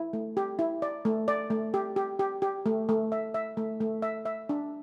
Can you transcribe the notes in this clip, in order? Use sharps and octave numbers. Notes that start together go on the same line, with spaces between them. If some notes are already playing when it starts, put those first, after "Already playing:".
Already playing: E4
A3
G4
E4
D5
A3
D5
A3
G4
G4
G4
G4
A3
A3
E5
E5
A3
A3
E5
E5
D4